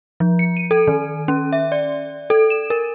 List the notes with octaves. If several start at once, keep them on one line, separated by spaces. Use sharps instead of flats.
F3
C#7
D#7
A4
D#3
C#4
E5
D5
A4
E7
A#4